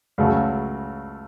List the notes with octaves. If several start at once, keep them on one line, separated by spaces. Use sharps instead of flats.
C#2 C#3 F#3 A3